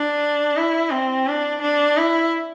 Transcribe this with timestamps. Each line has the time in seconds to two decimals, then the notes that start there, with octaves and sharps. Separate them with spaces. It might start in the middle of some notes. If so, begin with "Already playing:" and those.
Already playing: D4
0.56 E4
0.91 C4
1.27 D4
1.62 D4
1.97 E4